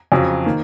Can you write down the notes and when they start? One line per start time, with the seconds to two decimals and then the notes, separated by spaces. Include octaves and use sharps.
0.12 F2 C#3 F#3
0.45 D#3 A#3